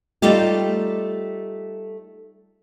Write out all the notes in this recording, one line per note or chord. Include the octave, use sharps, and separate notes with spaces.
G3 A3 D#4 F4 G4